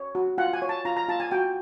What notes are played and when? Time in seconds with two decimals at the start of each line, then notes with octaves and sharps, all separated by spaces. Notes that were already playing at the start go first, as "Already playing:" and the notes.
Already playing: C#5
0.15 F#4
0.38 F4 F#5
0.53 G#5
0.62 C#5
0.69 A5
0.85 F4 A#5
0.97 A#5
1.09 F4 A5
1.20 G#5
1.31 F#4 G5